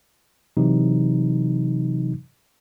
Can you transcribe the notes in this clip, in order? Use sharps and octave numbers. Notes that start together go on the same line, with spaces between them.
C3 E3 F#3 D#4